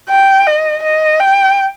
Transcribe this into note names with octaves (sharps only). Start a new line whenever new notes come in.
G5
D#5
D#5
G5